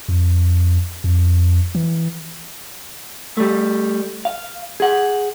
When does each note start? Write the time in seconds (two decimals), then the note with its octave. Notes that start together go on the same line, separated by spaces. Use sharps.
0.09 F2
1.04 F2
1.75 E3
3.37 G3 A3
4.25 F5
4.80 G#4 F#5